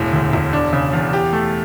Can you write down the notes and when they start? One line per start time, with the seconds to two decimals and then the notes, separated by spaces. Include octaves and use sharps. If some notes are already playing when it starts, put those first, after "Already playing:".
Already playing: E1 A2
0.13 D2
0.33 E1
0.53 D4
0.73 C#3
0.93 E2
1.13 G4
1.33 A3